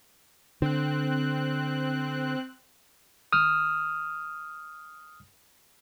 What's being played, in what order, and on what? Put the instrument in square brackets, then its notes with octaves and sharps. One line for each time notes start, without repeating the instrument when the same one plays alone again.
[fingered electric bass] D3 [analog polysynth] C4 F#6
[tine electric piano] D#6 F6